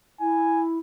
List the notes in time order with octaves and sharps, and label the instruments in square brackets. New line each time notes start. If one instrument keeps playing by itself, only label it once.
[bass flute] E4 [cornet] G#5